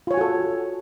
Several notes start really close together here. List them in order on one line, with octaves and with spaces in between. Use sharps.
F4 C#5 G#5 F#4 A4